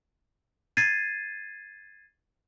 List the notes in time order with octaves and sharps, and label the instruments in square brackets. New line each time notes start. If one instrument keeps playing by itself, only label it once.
[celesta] G#6 A6 C7 D#7